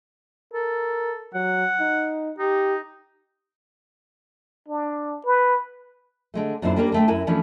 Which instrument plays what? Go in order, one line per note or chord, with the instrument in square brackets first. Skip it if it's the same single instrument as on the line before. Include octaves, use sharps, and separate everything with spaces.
[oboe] A4 [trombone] A#4
[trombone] F#3 [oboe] F#5
[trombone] D#4
[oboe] D#4 [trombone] G4
[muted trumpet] D4
B4
[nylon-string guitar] D3 G#3 A3
F#2 A#2 D3 E4 C5
G3 A#3 C#4 D4 A#4 B4
D3 A3 G5
F#2 E4 A#4 G#5
E3 F3 A3 C#4 D4